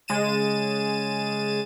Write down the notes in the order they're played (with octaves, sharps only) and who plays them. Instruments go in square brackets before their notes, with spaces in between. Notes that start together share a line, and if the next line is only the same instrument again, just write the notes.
[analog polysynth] C#3 G#3 A6 D#7 E7